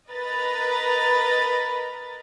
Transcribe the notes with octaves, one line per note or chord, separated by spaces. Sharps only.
A#4 B4 D#5 A#5 B5 A6